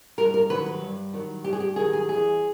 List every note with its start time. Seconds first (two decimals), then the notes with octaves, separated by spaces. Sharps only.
0.18 G2 A#4
0.34 A#4
0.50 D#3 F#3 B4
0.66 B4
0.81 G2
1.13 D#3 F#3
1.44 G2 G4
1.53 G#4
1.60 G4
1.76 D#3 F#3 G#4
1.93 G#4
2.08 E2 G#4